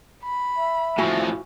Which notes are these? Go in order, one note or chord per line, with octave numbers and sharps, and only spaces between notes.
B5
E5
A2 F3 E4 F#4 G#5